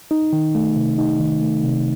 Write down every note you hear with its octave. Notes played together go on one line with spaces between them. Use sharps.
D#4
D#3
A3
C3
D#4
D#3
A3
C3